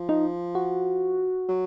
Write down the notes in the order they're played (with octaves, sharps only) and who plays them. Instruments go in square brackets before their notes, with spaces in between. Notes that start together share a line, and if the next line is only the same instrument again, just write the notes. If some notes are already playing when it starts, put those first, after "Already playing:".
Already playing: [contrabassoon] F3
[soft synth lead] D#4
F#4
[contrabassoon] F#3